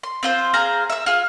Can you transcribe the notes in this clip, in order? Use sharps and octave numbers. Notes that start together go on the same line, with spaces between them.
C6
C4 F4 C5
G#4 C5 F5 A#5
E5 E6
F4 G#4